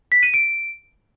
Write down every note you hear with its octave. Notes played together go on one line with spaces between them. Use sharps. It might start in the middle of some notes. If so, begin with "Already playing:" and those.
B6
D#7
D7